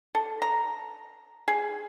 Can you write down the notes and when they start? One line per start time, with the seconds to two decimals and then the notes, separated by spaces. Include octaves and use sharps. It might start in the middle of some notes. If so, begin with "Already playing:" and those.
0.15 A4
0.42 A#5
1.48 G#4